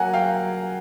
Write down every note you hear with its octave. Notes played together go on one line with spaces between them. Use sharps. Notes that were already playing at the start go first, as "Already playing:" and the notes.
Already playing: F#3 A#3 F#5 G#5
F#3 F5 G5